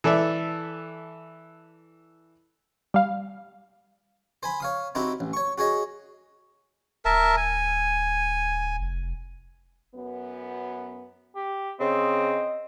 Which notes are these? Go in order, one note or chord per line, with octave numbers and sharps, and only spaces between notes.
E3 A4 D5 E5
G3 F5
C5 G#5 B5
C#5 F5 D#6
C4 D#4 E4 F#4 G4
A1
C#5 C#6
F#4 G#4 C#5 D#5
D1 A#4 E5 A5
G#5
F1
F#2 B3
G4
C#3 C4 D#5